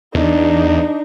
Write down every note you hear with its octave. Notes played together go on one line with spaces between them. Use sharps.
E2 D4 D#4